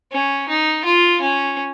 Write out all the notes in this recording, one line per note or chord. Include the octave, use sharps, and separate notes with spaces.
C#4
D#4
F4
C#4